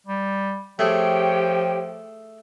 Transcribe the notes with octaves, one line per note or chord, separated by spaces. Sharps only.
G3
F3 A3 G4 G#4 C#5 G5